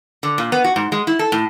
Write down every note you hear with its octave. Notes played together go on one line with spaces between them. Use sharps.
D3
A#2
B3
F#4
G#2
G#3
E4
A4
A2